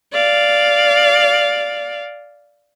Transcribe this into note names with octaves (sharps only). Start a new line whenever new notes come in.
D5 F5